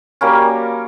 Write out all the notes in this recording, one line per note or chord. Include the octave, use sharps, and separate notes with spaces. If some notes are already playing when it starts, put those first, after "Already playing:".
F#3 G3 A#3 C#4